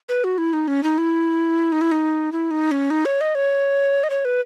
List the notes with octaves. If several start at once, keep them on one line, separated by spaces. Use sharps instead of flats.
B4
F#4
E4
D#4
C#4
D#4
E4
D#4
E4
D#4
E4
D#4
C#4
D#4
C#5
D#5
C#5
D#5
C#5
B4